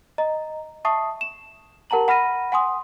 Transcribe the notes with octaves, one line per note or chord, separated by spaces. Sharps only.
D#5 A#5
E5 A5 C#6 D#6 C7
E7
G4 A#4 F#5 A5 A#5 F#7
F#5 B5 F6 A#6 D#7
F#5 G#5 C6 D#6